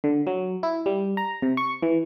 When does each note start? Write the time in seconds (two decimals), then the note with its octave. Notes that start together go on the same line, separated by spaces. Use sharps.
0.04 D3
0.27 F#3
0.63 E4
0.86 G3
1.17 A#5
1.42 C3
1.57 C#6
1.83 E3